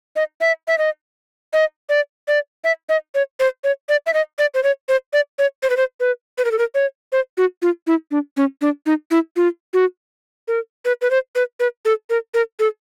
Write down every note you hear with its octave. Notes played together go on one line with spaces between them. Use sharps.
D#5
E5
E5
D#5
D#5
D5
D5
E5
D#5
C#5
C5
C#5
D5
E5
D#5
D5
C5
C#5
C5
D5
C#5
C5
B4
C5
B4
B4
A#4
A4
A#4
C#5
C5
F#4
F4
E4
D4
C#4
D4
D#4
E4
F4
F#4
A#4
B4
B4
C5
B4
B4
A4
A#4
A#4
A4